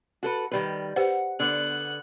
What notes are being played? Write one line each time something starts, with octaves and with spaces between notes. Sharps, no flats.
F#4 A4 B4
D#3 G3 B4
G4 B4 C5 F#5
D3 B3 F#6